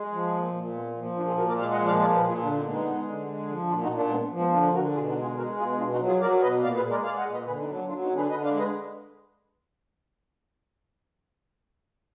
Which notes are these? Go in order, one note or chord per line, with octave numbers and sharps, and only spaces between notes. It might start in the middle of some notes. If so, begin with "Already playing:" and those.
Already playing: G#3
F3
A#2
A#2
G#3 B3
F3
A#3
A#2 D4 F4
F4 G#4
A#2 F#4 A#4
A#4 D5
G#3 D5 F5
D#5 F#5
F3
D5 F5
A#2 A#4 D5
G#4 B4
A#2
F4 G#4
D3 A#3 D4
B3 D#4
G#3
B3 D#4
G#3
D3
G#3
F3
A#2 D4 F4
D#4 F#4
A#2
A#3 D4
D4
G#3 B3
F3
G#3 B3
D3 A#3 D4
D3 F#4 A#4
B2 F4 G#4
D#4 F#4
G#3
F4 G#4
G#3 F#4 A#4
B2 F4 G#4
B2 D4 F4
D#4 F#4
F#3
F4 G#4
F#3 A#4 D5
B2 B4 D#5
A#2 D5 F5
G#4 B4
G#3
A#4 D5
G#3 D5 F5
D#5 F#5
A#2
B4 D#5
D3 G#4 B4
B3 D#4
F#3
A#3 D4
F#3 D4 F4
B3 D#4
D3
G#4 B4
D3 B4 D#5
D5 F5
G#3
B4 D#5